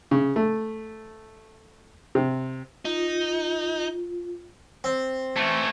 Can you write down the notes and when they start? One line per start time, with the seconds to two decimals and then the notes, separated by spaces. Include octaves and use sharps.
0.11 C#3
0.36 A3
2.15 C3
2.85 D#4 F4
4.84 C4
5.36 E3 A3